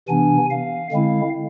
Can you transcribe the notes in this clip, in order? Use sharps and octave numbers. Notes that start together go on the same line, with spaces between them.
C3 E3 B3 D4 G#5
F5
D3 G#3 C4 E4 F5